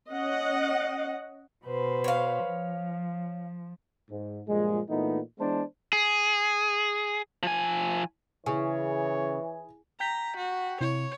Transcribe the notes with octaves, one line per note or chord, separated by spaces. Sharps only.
C#4 D#5 F#5
B2 B4 C5
C#5 F5
F3
G#2
G2 A#2 F3 G#3
A#2 E3 A3 B3 D#4
E3 G#3 B3 D4 C5 A5
G#4
F3 G#5
C#3 E3 E4 G#4 C#5 G#5
G5 A#5 G6 B6
F#4
C3 E4 C#5